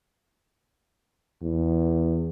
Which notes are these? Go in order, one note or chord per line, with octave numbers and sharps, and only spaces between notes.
E2